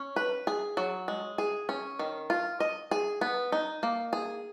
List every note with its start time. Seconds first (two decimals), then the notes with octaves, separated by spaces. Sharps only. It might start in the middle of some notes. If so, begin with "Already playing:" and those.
Already playing: C#4
0.16 B4
0.47 G#4
0.77 F#3
1.08 G#3
1.38 G#4
1.69 C#4
1.99 D#3
2.30 F4
2.60 D#5
2.91 G#4
3.21 B3
3.52 D#4
3.83 A#3
4.13 G#4